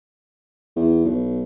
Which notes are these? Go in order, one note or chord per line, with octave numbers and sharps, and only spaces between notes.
E2
B1